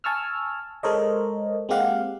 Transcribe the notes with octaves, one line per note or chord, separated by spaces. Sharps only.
G#5 A5 C#6 E6 F6
G#3 A4 A#4 C5 C#5 D#5
G#3 A#3 C4 G4 F5 F#5